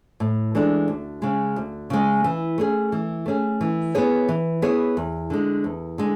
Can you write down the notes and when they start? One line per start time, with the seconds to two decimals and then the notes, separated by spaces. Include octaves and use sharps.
0.20 A2
0.55 E3 G#3 D4 A4
0.88 D2
1.22 C#3 G#3
1.56 D2
1.90 C#3 G#3
2.24 E3
2.58 A3 C#4 G#4
2.92 E3
3.26 A3 C#4 G#4
3.61 E3
3.95 B3 E4 G#4 C#5
4.29 E3
4.62 B3 E4 G#4 C#5
4.97 E2
5.30 D3 G#3
5.64 E2
5.98 D3 G#3